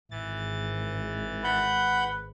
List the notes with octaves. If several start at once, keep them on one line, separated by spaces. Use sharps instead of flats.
G#1 E3 A6
B4 F#5 B5 G6